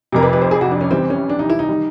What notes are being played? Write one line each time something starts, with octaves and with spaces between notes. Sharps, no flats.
F1 F2 C3 A#4
B4
B4
C5
G#4
F#4
D4
C#4
C3 E3 G3 C4
C#4
D4
D#4
E4
D#4
D#3 G3